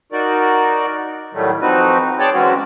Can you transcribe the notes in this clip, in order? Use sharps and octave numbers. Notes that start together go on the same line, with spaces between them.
D#4 F#4 A#4 D5
A2 D#3 F#3 G3 A3
F3 C4 D#4 F#4 B4
G#4 C#5 D5 G5 A5 D6
E3 F#3 G#3 C4 C#4 F#4